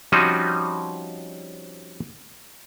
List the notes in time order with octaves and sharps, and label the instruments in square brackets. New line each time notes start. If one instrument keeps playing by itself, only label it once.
[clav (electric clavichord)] F3 G3 C4 C#4 D#4 F#4